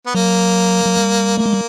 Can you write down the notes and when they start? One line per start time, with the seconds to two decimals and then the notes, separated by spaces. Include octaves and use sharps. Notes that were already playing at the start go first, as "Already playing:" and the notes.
0.07 B3
0.15 F#3 A#3
0.86 F#3
0.97 G3
1.37 A3 A#3
1.46 G#3
1.53 G3